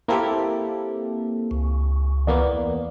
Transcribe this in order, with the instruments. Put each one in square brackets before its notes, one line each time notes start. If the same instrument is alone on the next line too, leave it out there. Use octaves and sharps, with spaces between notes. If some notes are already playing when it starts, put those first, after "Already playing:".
[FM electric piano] A#3 C4 A4 [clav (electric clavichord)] E4 G4
[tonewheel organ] C#2
[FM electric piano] E2 A#3 B3 [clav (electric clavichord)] D5